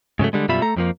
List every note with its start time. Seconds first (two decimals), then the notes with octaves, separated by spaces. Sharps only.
0.19 G#2 C#3 F#3 A3
0.33 D3 G3 G#3
0.49 F#2 B2 G3 F4 E5 B5
0.62 A3 A4 A#5
0.76 F2 F3 A#3